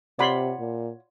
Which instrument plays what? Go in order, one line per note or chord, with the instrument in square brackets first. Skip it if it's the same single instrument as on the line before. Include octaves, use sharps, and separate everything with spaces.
[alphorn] C3 [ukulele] F4 C#5 F#5 [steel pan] D5 B5 C6
[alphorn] A#2